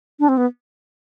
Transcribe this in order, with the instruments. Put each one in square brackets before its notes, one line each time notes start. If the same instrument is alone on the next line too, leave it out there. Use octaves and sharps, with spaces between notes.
[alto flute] D4
C4
B3